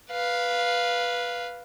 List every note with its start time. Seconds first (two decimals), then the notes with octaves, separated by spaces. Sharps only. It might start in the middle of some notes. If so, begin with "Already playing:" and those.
0.11 B4 F5